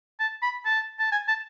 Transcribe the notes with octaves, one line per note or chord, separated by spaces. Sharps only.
A5
B5
A5
A5
G#5
A5